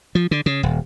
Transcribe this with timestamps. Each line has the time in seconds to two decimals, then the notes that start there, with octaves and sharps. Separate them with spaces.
0.15 F3
0.31 D3
0.46 C#3
0.63 D#1